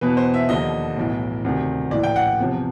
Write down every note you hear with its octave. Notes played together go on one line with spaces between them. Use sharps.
E2 B2 B4
C5
E5
D#2 D3 F3 D#5
B1 A2 E3
D2 C3 D#3
A#1 A2 E3 D5
G5
F#5
E2 C3 F3